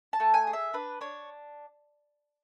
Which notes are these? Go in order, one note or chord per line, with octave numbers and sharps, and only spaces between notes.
A5
A3
G#5
G#4
E5
D4 B4
D4 C#5